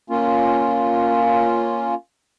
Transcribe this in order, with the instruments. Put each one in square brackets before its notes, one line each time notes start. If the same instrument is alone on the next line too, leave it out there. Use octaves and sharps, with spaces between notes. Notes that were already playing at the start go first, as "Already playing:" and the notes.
[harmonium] A#3 C#4 F4